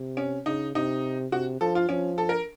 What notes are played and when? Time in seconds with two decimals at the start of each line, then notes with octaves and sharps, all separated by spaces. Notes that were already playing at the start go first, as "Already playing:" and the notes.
Already playing: C3
0.17 C#4
0.46 C#3 D#4
0.75 C3 D#4
1.32 C3 F#4
1.61 F3 A4
1.75 F4
1.89 F3 C#4
2.18 A4
2.29 A#4